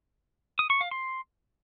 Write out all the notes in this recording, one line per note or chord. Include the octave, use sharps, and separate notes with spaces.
D#6
C#6
F5
C6